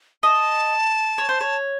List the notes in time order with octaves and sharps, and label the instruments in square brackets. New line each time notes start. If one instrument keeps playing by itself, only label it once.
[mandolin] D#5 [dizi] A5
[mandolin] C#5
C5
C#5